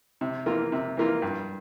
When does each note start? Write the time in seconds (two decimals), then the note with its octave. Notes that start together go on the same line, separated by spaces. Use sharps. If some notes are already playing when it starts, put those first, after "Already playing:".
0.21 C3
0.46 E3 A#3 F4
0.72 C3
0.97 E3 A#3 F4
1.22 G2